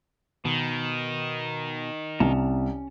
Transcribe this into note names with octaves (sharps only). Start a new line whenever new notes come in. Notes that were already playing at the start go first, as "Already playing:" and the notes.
B2 D#3
C2 C#4 A5 A#5